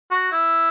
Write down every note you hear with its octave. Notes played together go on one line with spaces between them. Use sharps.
F#4
E4